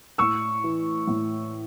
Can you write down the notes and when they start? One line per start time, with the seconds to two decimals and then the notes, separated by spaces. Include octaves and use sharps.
0.18 A2 C#6 E6
0.64 E3
1.07 A2